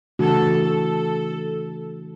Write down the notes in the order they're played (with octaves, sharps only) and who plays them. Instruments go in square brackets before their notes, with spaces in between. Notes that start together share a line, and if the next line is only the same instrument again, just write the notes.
[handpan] C#3 E3 A3 D4 F#4 [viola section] A4
[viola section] A4